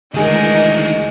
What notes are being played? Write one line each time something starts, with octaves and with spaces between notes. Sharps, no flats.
D2 D#3 E3 G#3 D#4 G#4 A#4